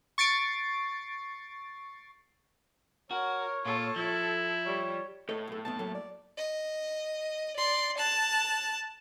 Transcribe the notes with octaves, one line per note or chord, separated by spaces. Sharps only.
C#6 A6 C7 D7
F#4 A#4 C#5
A#2 F4 A4
F3 E4
G3 C#5
A2 A4 C#5 D#5
B1 A4
B1 F#2 B3 A5
F#3 A#3 A4
D5
D#5
D5 C6
A5 F#6